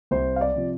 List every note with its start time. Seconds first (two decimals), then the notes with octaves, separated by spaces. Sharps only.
0.11 C2 C5
0.36 F5
0.41 D5
0.56 C3 F3